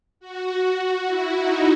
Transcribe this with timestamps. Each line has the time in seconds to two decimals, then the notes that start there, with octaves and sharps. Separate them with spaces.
0.20 F#4
1.05 E4
1.34 D#4